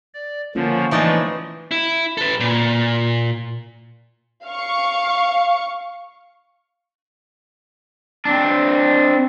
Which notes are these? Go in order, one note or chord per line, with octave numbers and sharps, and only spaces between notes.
D5
D3 F3 A#3 C#4 F4
E3 F3 G#3 A3 D#4 D5
E4
A4 B4
A#2
F5 C#6
C4 D4